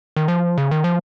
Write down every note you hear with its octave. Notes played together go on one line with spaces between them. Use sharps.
D#3
F3
C#3
D#3
F3